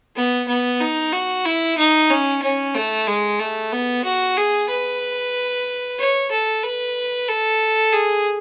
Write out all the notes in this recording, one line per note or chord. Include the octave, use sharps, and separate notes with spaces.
B3
B3
D#4
F#4
E4
D#4
C#4
C#4
A3
G#3
A3
B3
F#4
G#4
B4
C#5
A4
B4
A4
G#4